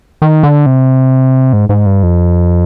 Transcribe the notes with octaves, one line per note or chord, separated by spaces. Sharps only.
D#3
D3
C3
G#2
G#2
G2
F2